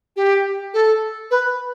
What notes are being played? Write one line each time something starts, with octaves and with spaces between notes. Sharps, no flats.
G4
A4
B4